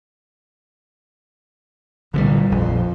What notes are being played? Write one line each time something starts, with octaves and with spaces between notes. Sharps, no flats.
C2 A#2 D3 D#3 G3
A#1 F2 F3